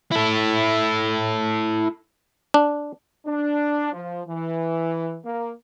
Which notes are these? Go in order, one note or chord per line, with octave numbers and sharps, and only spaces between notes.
E4 A4
D4
D4
F3
E3
A#3